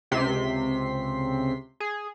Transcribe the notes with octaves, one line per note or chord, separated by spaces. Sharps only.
C#2 C3 C6 B6
G#4